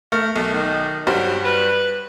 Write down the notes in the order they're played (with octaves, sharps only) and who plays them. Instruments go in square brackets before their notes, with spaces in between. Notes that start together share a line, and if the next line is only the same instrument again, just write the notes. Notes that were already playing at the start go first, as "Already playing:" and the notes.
[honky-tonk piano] A3 [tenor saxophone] A#4
[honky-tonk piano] B1 [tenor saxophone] A3
[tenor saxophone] D#3
[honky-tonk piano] G2 G3 C5 [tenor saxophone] F#3
[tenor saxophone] B4